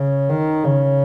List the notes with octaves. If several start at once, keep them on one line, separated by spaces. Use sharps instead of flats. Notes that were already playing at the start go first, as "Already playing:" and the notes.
Already playing: C#3
D#3
C#3